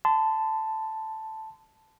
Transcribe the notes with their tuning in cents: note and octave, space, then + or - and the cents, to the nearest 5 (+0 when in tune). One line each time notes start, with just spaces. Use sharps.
A5 +0 C6 -35